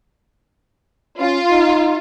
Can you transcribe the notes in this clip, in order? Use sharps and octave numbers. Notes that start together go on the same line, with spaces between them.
C#4 F4
D#4